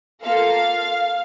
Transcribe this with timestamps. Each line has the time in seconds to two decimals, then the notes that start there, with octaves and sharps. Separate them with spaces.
0.23 A#3 F4 A4 F5